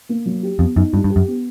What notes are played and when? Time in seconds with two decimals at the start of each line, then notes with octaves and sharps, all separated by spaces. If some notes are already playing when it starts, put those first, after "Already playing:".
0.09 A#3
0.26 F#3
0.43 G4
0.59 F2 B3
0.76 F#2 D#4
0.93 G2 G3
1.04 G2
1.10 G4
1.16 F#2
1.27 B3